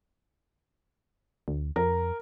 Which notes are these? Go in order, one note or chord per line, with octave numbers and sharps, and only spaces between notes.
D2
F2 A#4